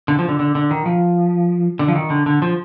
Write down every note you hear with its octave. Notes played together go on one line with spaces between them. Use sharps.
D3
F3
D3
D3
D3
D#3
F3
D3
F3
D#3
D3
D3
F3